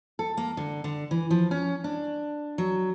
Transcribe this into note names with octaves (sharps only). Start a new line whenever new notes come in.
A4
A#3
D3
D3
E3
F3
C#4
D4
F#3